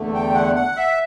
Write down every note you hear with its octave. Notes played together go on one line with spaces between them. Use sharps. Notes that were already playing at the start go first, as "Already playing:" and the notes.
Already playing: E2 D3 A3
G5
F#5
F#5
E5